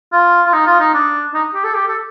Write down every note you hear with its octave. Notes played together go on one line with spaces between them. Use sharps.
F4
F4
D#4
F4
D#4
D4
D#4
G4
A4
G4
A4